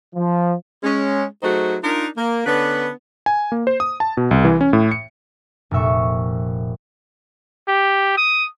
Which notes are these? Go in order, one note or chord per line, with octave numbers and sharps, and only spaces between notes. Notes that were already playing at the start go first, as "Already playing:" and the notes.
F3
G#3 C#4
F#3 A3 D#4 F#4 G#4 C5
D4 D#4 F4 A#4
A#3
D3 B3 C#4 D4 B4
G#5
A#3
C5
D#6
A5
B2
C2
E3
C#4
A2
C#7
F1 A#2 E5 C#6
G4
D#6